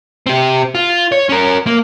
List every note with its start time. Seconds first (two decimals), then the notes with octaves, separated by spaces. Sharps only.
0.26 C4 G4
0.75 F4
1.12 C#5
1.29 C#4 A#4
1.67 A#3